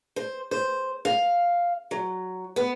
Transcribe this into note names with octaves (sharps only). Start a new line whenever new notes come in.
C5
C5
F5
F#3
B3